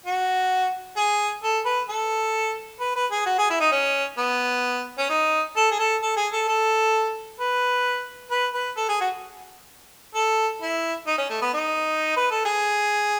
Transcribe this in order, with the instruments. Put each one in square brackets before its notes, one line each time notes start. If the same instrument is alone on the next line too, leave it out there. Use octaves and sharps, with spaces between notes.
[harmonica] F#4
G#4
A4
B4
A4
B4
B4
G#4
F#4
G#4
E4
D#4
C#4
B3
C#4
D#4
A4
G#4
A4
A4
G#4
A4
A4
B4
B4
B4
A4
G#4
F#4
A4
E4
D#4
C#4
A3
B3
D#4
B4
A4
G#4